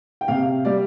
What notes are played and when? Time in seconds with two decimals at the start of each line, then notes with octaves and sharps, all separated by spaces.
0.21 G5
0.28 C3 F5
0.65 G3 D5